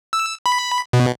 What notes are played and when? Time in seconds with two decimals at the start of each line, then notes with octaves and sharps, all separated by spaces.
0.13 E6
0.46 B5
0.93 B2